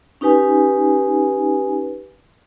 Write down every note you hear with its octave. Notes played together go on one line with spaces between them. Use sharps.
C#4 D#4 G4 B4 G#5